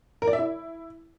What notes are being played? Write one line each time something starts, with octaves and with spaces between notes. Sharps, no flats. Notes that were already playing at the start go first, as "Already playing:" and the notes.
A#4
D5
E5
E4